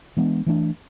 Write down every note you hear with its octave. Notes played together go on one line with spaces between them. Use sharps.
E3 G#3 B3 D4
E3 A3 D4